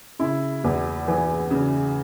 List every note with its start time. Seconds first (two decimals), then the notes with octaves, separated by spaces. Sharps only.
0.19 C#3 E4
0.64 E2
1.08 E3
1.51 C#3